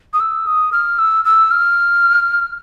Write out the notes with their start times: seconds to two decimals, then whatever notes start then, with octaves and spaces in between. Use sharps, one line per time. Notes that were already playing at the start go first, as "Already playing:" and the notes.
0.13 D#6
0.20 E6
0.47 D#6
0.72 F6
0.99 E6
1.25 E6
1.51 F6